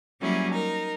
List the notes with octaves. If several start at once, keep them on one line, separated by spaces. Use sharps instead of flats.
F#3 G3 A#3 C#4 E4 G#4
D#4 A#4